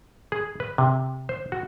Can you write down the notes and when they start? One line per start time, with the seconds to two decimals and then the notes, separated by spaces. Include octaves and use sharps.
0.32 G#4
0.60 B4
0.78 C3
1.29 C5
1.52 F#4